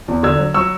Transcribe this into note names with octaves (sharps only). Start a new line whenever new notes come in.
E2
D3 E6 G#6
F#3
F#3 C#6 E6